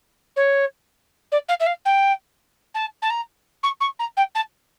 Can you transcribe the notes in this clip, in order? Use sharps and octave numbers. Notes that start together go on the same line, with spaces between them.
C#5
D5
F5
E5
F5
G5
A5
A5
A#5
C#6
C#6
A#5
G5
A5